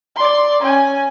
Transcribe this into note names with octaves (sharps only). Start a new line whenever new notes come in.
D5 C6
C#4 G#5